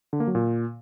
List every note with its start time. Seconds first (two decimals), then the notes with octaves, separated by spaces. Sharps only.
0.13 D3
0.20 A#3
0.27 F#3
0.35 A#2